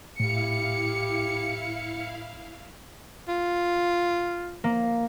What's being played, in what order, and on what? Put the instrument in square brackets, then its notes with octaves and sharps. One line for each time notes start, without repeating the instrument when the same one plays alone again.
[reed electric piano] A2 [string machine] E4 F5 [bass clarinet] G4 [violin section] C#7
[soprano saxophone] F4
[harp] A#3